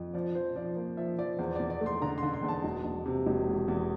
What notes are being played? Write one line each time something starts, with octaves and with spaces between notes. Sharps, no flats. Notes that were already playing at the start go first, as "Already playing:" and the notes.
Already playing: F2
F3 D5
F3 C5
F3 D5
A#3
F3 E5
F3 D5
E2 C5
E2 D5
D5
A3
C6
D3 A#5
D3 C6
C6
E2
A5
E1
E1
C3
E1
E2
E2